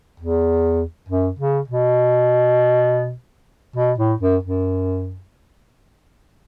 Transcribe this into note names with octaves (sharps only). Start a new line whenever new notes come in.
E2
F#2
C#3
B2
B2
A2
F#2
F#2